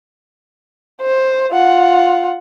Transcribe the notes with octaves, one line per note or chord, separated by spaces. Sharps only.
C5
F4 F#5